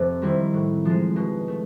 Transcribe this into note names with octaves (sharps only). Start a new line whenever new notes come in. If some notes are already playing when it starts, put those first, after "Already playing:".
Already playing: F2 C3 F3
D#3 G3 C4 E4
A2
F3 G#3
B2
A3